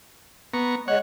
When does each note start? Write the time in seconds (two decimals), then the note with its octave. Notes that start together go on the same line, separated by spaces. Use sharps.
0.54 B3 A#5 C#6
0.88 G#3 C#5 F#5